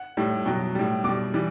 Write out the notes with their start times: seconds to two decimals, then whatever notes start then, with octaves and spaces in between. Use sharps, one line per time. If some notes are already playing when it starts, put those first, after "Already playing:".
Already playing: F#5
0.17 A2 G3
0.46 B2 F#3 G5
0.75 A2 G3
1.04 B2 G3 D6
1.34 E3 G3